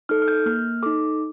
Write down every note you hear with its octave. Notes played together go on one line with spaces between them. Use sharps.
D#4 A4 F6
F6
G6
A#3 F6
D#4 A4 D6